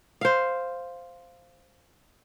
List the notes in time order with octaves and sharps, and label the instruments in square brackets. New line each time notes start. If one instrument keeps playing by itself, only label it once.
[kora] C5 F5